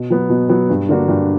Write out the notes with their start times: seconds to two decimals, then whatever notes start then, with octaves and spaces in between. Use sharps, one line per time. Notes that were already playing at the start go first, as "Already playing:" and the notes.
Already playing: B2
0.10 F#3 B3
0.29 B2
0.49 F#3 B3
0.70 G2
0.89 D3 A#3 D4 F#4
1.08 G2